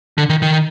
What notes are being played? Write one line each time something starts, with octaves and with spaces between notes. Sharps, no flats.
D3
D#3
D#3